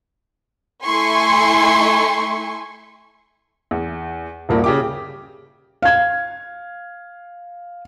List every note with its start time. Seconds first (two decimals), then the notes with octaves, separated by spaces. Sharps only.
0.84 A3 E4 G#5 C6 C#6
3.71 E2
4.49 D#1 G2 A#3 F#4
4.64 C#3 G4 D6
5.82 F5 G#6